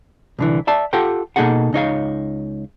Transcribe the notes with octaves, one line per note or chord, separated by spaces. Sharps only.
C2 D3 E3
D5 E5 A5
F4 G4 A4 F#5 G5
B2 A#3 D#4 G#4 A4 F#5
C#2 D#4 C#5 F5